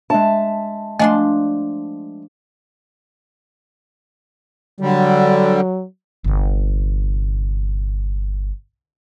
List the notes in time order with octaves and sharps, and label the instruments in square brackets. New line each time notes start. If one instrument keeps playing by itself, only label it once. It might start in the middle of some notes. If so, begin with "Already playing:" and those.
[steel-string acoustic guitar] G#3 E5 A5 [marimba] D4
[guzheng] F3 D4 C6 [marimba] A3 D#5 G#5
[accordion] D3 G3 [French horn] F#3
[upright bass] G1 C3